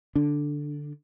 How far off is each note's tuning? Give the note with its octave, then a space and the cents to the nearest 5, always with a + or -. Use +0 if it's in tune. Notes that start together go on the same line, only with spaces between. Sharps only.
D3 +0 D4 +0